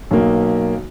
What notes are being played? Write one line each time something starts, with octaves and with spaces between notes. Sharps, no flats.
B1 A#3